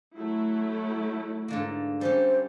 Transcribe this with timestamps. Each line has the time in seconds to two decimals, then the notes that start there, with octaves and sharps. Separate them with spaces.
0.17 F#3 A3 E4
1.48 G#2 D3 A#3
2.01 G3 C#4 G4 C5